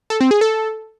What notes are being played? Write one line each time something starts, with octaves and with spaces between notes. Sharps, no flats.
A4
C4
G#4
A4